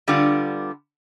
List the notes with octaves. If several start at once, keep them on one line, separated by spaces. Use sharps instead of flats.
D3 G3 B3 D4 F4